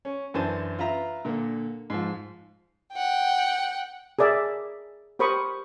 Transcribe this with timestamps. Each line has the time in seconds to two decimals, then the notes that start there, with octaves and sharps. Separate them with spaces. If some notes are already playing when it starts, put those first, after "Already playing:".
0.05 C#4
0.34 F#2 E3 D4 C5 G#5 A5
0.79 F4 B4 E5 A#5
1.25 A#2 D3 A#3
1.90 G#2 F3
2.94 F#5 G5
4.19 G#4 A#4 D5 E5 G#5
5.19 G4 A#4 C5 B5 C#6 D#6